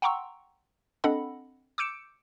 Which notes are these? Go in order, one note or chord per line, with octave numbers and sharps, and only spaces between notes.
F#5 G5 A#5 C6 C#6 E6
C4 D4 A4 D#5 F#5 B5
D6 E6 G6 C#7 D7 E7